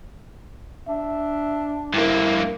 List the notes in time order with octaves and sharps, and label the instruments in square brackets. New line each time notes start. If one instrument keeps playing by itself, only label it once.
[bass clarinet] D4 [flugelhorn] E5
[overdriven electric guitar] G2 A#3 [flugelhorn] E4